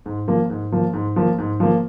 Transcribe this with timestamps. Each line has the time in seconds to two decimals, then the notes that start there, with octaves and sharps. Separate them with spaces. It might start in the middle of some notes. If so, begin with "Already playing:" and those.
0.06 G#2
0.28 F3 A#3
0.50 G#2
0.72 F3 A#3
0.93 G#2
1.16 F3 A#3
1.38 G#2
1.60 F3 A#3